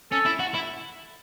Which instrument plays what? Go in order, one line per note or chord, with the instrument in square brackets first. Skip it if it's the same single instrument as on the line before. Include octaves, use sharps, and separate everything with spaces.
[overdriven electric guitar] C#4 [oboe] A4
[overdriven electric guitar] E4
F#4
E4